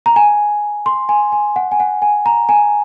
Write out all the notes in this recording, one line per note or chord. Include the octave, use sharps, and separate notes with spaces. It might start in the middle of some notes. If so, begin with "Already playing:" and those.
A#5
G#5
C6
G#5
G#5
F#5
G#5
F#5
G#5
A#5
G#5